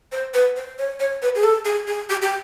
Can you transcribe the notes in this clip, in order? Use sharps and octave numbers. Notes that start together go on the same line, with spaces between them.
C5
B4
C5
C#5
C#5
B4
G#4
A4
G#4
G#4
G4
G4